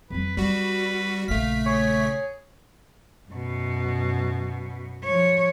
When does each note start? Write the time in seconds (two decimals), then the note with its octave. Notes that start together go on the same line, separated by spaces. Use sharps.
0.10 F2 F#3 B4
0.37 G3 C4 F#4 B4
1.28 A#1 C#3 A3 F5 B6
1.66 G#4 C#5
3.29 F#2 B2
5.04 F3 C#5